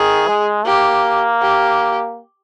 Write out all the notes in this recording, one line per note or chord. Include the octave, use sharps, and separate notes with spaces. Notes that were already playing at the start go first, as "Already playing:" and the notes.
Already playing: D#3 G#4
G#3
A#3 G4
G4